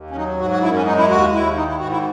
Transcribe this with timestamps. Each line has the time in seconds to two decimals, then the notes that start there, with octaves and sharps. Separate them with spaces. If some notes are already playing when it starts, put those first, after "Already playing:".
Already playing: D#2
0.11 C#4
0.16 F#3 D#4
0.39 G#2 F#4
0.51 F#4
0.62 F#2 E4
0.74 C#4
0.85 G#3 D#4
0.98 E4
1.09 D#2 F#4
1.33 D#2 E4
1.56 D#3 D#4
1.68 E4
1.79 G#2 F#4
1.90 E4